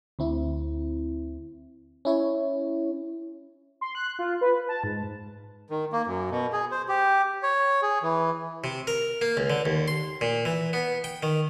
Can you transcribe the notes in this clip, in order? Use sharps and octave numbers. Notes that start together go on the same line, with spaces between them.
D2 C4 E4
C#4 E4 C#5
C6
F#6
F4
B4
A5
G#2
D#3
A#3
F#2
B2
G#4
C5
G4
C#5
G#4
E3
C3
A#4
A#3
C#2
D3
D#2
C6
A#2
E3
B3
G5
D#3